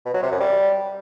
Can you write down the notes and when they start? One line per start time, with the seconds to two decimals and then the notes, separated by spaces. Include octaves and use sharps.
0.05 B2
0.14 F#3
0.23 C3
0.31 F#2
0.40 G3